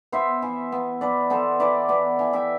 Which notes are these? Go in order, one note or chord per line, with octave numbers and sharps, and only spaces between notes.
B3 C5 E5
E3
B3
B3 B4 D5
B3 A4 C5
E3 B4 D5
B3 B4 D5
E3
E5 G5